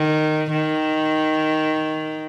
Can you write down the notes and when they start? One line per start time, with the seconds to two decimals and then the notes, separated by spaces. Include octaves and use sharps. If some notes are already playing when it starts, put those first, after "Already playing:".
Already playing: D#3
0.52 D#3